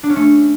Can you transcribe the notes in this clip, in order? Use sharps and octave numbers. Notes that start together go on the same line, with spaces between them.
D4
C#4
A3